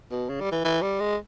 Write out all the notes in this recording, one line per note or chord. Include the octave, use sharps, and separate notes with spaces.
B2
C#3
G3
E3
E3
G3
G#3